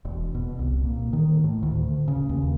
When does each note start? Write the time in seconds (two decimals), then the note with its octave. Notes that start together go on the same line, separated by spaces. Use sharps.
0.05 E1
0.35 B2
0.59 C2
0.84 A#2
1.13 D#3
1.44 A2
1.63 D2
2.08 C#3
2.29 D#2